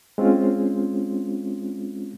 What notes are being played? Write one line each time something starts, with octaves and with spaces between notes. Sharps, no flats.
G#3 C4 C#4 F4